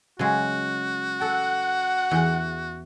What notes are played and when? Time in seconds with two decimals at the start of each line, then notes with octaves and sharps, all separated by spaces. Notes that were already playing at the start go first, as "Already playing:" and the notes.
0.19 C#3 F#3 G#3 F#4
1.21 A4 F#5
2.11 E2 G5